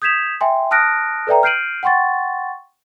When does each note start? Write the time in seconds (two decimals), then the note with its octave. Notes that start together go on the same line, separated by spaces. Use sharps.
0.02 D#6 G6 G#6 B6 E7 F7
0.41 E5 G5 G#5 C6
0.71 A5 D#6 F6 F#6 A#6 D7
1.27 A4 B4 D5 E5 G5 A#5
1.43 F6 G6 C7 D7 D#7 F#7
1.83 F#5 G5 C6 C#6 A6